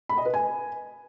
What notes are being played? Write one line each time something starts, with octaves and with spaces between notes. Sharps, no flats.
B5
D#5
B4
G#5